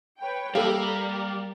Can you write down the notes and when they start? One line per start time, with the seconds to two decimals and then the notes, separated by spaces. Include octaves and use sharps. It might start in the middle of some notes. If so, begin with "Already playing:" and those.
0.20 B4 C#5 G5
0.55 G3 A#3 G4 A4 A#4 F5